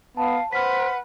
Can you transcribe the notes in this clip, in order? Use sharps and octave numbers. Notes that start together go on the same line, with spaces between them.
B3 F5 A5
B4 C5 F#5 F6 B6